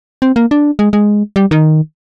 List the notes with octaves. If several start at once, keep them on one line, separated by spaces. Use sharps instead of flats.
C4
A#3
D4
G#3
G#3
G3
D#3